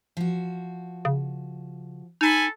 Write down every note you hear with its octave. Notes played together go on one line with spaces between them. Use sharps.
F3 F#4
C#3
D#4 A4 G#5 B5